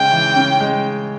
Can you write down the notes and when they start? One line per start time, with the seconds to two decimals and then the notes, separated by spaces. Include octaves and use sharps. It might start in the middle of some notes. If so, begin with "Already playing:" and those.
Already playing: C#3 G#3 G5
0.12 E3
0.36 C#3
0.60 G#3